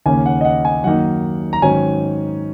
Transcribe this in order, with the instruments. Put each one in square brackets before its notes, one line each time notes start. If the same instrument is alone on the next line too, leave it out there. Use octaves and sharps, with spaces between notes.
[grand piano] D#2 C#3 A#3 C#4 G#5
F#5
D#5
F#5
G#5
F#2 D#3 A#3 D#4 F#5
A#5
G#2 D#3 F#3 C#4 G#5